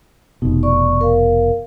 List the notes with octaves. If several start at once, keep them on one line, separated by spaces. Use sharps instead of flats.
F1 B2 D#4
D5 C#6
A#4 F5